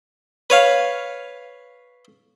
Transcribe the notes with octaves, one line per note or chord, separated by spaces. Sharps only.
B4 C#5 F5